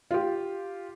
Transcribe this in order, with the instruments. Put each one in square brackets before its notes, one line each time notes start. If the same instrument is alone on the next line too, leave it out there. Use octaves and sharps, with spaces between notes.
[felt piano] F4 G4